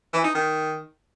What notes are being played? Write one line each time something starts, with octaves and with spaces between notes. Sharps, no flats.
E3
D#4
D#3